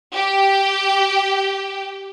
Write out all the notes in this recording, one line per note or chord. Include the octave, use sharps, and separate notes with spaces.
G4 G5